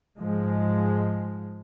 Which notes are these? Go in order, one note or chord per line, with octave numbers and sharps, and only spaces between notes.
G#2 F3 G#3